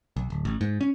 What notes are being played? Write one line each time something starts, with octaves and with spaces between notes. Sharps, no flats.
B1
D1
A1
G#2
C#4